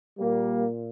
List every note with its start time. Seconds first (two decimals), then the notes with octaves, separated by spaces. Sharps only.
0.19 A#2 G3 A#3